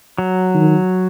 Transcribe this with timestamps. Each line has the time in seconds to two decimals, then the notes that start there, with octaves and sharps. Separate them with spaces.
0.18 F#3
0.55 D#3